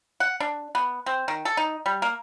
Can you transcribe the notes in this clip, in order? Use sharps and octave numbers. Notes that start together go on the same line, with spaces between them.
F#5
D4
B3
C4
D#3
A4
D#4
G3
A#3